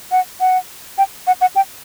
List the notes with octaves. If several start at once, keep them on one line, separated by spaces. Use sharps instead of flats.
F#5
F#5
G5
F#5
F#5
G5